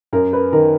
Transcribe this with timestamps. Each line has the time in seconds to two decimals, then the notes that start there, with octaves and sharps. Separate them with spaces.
0.13 F#2 A#4
0.33 B4
0.53 D#3 A#4